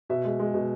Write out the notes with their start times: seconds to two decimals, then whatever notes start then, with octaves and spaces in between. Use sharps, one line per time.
0.10 B2 E5
0.24 G#3
0.39 G#3
0.54 B2